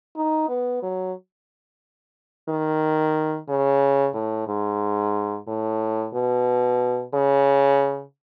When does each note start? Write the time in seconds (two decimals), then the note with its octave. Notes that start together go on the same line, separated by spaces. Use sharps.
0.16 D#4
0.49 B3
0.83 F#3
2.48 D#3
3.49 C#3
4.15 A2
4.48 G#2
5.48 A2
6.14 B2
7.14 C#3